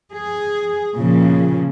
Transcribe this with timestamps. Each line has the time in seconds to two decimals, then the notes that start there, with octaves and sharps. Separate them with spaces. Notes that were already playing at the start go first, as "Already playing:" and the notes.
0.13 G#4
0.97 A#2 C#3 F3